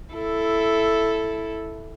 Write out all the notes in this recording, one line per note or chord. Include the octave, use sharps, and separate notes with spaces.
E4 A4